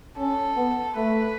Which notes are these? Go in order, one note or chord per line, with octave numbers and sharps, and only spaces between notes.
C#4 A4
B3
A3 B4